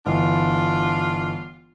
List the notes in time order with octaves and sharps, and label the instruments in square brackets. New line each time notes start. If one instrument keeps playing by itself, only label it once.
[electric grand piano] G1 E3 [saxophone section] D4 F4